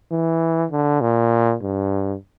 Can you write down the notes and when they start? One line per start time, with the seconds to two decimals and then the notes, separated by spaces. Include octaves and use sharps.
0.12 E3
0.72 D3
1.01 A#2
1.62 G2